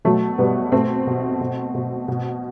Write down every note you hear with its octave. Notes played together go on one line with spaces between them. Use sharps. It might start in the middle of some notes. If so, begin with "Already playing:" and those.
B2 F#3 A3
B2 G3 B3
B2 A3 C4
B2
B2
B2
B2